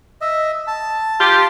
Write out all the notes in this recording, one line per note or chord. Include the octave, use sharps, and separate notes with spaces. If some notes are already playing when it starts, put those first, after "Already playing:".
D#5 E5
A5
F4 G4